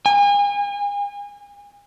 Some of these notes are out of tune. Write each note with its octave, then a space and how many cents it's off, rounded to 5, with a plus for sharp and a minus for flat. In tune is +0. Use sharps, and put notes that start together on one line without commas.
G#5 -40